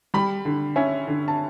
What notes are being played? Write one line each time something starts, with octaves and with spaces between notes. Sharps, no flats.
G3 B5
D3
C#4 E5
D3
A5